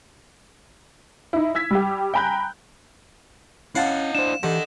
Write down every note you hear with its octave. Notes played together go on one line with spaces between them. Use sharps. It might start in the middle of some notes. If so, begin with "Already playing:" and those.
D#4 E4
E6 G#6 B6
G3 G4
G5 G#5 A#5 B5 F#6 G6
C#4 E4 D#5 F5 F#5 A5
D4 C5 E7
D3 E3 G4 A#4 D#5